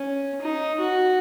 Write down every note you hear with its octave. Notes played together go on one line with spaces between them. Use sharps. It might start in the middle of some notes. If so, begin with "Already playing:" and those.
Already playing: C#4
D#4
F#4